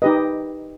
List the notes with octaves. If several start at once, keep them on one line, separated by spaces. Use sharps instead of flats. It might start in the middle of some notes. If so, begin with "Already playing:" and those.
D#4 G4 B4 D#5